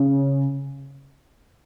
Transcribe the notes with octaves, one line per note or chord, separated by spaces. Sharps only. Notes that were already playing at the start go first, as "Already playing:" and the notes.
Already playing: C#3